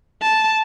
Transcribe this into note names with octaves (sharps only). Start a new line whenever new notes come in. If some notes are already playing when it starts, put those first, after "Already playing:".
A5